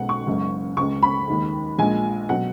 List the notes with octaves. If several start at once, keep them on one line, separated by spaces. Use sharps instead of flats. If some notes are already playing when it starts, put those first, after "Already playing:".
Already playing: B1 B2 G#3 F#5
C#6
F#1 F#2 C#3 G#3
C#2 C#3 G#3 C#6
B5
D#2 D#3 G#3
A#1 A#2 G#3 G#5
B2 F#3 F#5